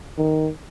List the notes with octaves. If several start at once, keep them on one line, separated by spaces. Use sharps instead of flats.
D#3